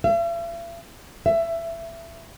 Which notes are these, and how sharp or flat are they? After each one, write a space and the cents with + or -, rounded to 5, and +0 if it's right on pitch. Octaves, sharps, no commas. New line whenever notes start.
E5 +45
E5 +20